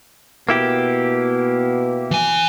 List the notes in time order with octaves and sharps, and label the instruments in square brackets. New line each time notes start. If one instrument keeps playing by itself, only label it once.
[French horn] B2 [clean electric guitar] A#3 E4 G4
[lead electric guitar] E3 G#5